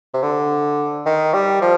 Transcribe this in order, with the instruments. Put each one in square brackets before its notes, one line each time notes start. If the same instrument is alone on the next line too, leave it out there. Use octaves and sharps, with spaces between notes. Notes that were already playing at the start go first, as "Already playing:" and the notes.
[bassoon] C3
D3
D#3
G3
F3